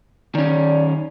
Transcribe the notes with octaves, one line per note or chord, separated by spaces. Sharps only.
D#3 C#4 D5